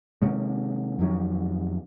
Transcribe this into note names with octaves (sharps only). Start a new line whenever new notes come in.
C3 D#3 G#3 C#4
F2 D#3 F#3 C#4